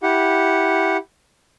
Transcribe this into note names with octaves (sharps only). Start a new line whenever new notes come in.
E4 G4 F#5